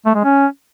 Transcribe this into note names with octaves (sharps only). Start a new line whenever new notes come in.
A3
G#3
C#4